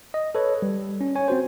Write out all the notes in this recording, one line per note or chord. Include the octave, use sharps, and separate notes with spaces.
D#5
A4 B4 C#5
G3
C#4
C#5 G#5
C4 F#4 C5